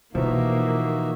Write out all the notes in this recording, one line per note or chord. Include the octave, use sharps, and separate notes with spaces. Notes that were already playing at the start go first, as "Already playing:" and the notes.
B2 E3 F3 A#3 D#4 F#4 E5